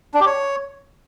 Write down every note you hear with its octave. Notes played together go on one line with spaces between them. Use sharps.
D4
G4
C#5